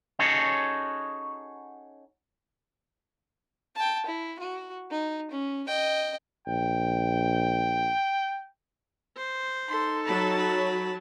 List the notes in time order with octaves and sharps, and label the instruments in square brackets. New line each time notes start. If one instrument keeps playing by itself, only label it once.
[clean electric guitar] C#4 D#4 F#4 G#4 A4 C#5
[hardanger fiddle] G5 A5
E4
F#4
D#4
C#4
D#5 G5
[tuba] A#1 [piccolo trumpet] G5
[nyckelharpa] C5
[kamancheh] D#4 A4 [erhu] C6
[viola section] F#3 [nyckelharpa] A5 [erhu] B5
[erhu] B5